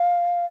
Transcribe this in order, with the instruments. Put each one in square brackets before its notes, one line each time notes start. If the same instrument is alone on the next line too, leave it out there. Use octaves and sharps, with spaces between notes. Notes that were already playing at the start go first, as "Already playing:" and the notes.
Already playing: [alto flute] F5